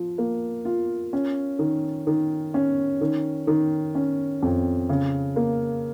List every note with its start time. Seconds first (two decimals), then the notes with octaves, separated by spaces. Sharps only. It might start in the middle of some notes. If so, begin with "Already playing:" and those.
Already playing: F3
0.18 A#3
0.65 F4
1.13 C#4
1.59 D#3
2.07 D#3
2.54 C#4
3.01 D#3
3.47 D#3
3.95 C#4
4.42 F2
4.89 C#3
5.36 A#3